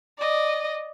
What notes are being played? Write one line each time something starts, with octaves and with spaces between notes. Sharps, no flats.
D5 D#5